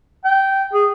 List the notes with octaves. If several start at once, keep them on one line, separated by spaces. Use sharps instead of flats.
G5
G#4